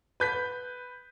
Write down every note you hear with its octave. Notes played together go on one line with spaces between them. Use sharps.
B4 G6 B6